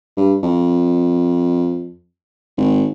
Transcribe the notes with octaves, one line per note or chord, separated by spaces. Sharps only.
G2
F2
G#1